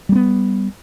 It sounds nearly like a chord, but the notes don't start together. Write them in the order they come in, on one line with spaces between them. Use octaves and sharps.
G3 A#3 B3